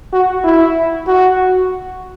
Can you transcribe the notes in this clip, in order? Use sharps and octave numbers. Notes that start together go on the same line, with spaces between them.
F#4
E4
F#4